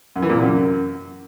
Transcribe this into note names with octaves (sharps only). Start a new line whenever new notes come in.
F#2
E3
A#2
C3
F#2